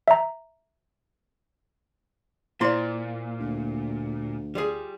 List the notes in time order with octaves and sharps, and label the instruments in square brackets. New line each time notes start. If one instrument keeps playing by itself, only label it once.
[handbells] E5 A#5
[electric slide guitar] A#2 [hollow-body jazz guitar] A#3 C6 [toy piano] E4 C5 D5
[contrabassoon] D2
[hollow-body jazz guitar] G3 F4 G#4